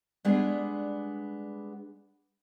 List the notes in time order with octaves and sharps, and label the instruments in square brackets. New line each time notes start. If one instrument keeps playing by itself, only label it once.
[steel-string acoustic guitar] G3 G#3 B3 D4 G#4